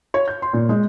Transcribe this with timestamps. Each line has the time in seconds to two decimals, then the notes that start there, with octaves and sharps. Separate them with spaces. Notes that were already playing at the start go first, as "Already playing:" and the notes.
0.14 C#5
0.28 G6
0.42 C6
0.53 A#2
0.69 G#3